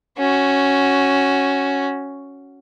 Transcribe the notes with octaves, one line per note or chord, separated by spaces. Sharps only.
C#4 F#4